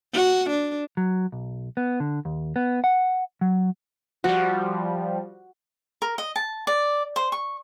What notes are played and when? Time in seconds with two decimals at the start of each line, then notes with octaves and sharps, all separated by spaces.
0.14 F#4
0.50 D4
0.97 F#3
1.32 B1
1.77 B3
2.00 D3
2.25 D#2
2.56 B3
2.84 F#5
3.41 F#3
4.24 F3 G3 F#4
6.02 A#4
6.18 D#5
6.36 A5
6.67 D5
7.16 C5
7.32 C#6